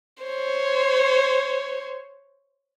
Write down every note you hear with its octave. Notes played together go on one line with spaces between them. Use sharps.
C5 C#5